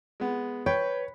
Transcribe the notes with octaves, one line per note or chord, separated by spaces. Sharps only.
G#3 B3
B4 C#5 G5